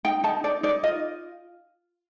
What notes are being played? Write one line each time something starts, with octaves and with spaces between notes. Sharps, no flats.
D#4 G5
D#4 A5
D#4 D5
D#4 D5
F4 D#5